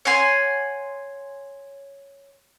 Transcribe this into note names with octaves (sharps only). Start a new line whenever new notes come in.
C#5 F#5 G#5 C6